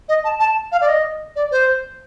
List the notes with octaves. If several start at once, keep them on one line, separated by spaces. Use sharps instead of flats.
D#5
A5
A5
F5
D5
D#5
D5
C5